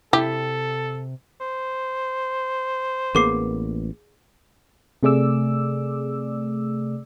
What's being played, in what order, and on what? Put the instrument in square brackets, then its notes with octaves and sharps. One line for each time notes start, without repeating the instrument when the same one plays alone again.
[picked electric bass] C3 [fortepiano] E4 [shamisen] G4 [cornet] A4
[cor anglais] C5
[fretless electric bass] A1 A#3 B3 [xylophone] G#4 D6 C7
[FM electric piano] C3 A3 G#4 D5 D6 E6